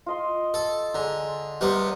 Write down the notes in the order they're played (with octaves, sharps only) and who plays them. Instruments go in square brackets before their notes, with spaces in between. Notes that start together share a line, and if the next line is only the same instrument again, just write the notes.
[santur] F4 D#5 C6
[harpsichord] A4
[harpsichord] D3 [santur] G#3 A#5
[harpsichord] C3 G3 B3 [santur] A#4 C5